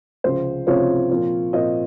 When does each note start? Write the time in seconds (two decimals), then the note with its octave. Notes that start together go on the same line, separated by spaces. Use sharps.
0.24 C#2 C3 F3 C4 F4 C5
0.67 C#2 C3 F3 C4 F4 C#5
1.10 A#2 F3 C4 F4
1.53 A#2 F3 C4 F4 D#5